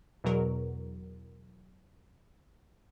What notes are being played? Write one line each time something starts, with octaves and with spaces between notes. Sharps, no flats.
E2 B2 F#3 A#4